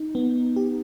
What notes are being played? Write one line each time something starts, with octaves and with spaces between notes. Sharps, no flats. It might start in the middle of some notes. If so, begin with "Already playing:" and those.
Already playing: D#4
B3
G4